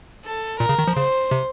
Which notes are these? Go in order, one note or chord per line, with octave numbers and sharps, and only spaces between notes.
A4
A#2 A#4
C#3
D#3
F3
C#3 C5
C3